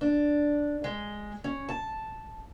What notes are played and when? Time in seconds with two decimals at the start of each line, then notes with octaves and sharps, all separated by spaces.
0.01 D4
0.84 G#3
1.44 C#4
1.69 A5